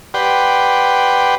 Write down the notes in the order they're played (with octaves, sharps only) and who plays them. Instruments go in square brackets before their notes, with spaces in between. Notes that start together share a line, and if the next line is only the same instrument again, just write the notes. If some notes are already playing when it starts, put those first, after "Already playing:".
[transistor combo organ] G4 B4 D5 F#5 G5 C6